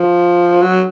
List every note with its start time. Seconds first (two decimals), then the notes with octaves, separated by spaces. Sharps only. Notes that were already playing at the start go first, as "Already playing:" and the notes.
Already playing: F3
0.62 F#3